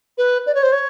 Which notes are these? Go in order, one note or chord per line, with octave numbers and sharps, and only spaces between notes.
B4
D5
C#5
C5
C#5